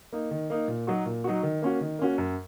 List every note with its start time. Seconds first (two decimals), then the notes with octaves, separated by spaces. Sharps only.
0.12 A#3 D#4
0.31 D#3
0.50 A#3 D#4
0.68 A#2
0.87 F#3 D#4 F#4
1.06 A#2
1.24 F#3 D#4 F#4
1.43 D#3
1.62 A#3 C#4 F#4
1.81 D#3
1.99 A#3 C#4 F#4
2.18 F#2